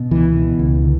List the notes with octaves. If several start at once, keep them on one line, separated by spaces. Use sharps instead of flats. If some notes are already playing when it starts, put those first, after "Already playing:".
Already playing: B2
C#2 E3
B2
C#2
D3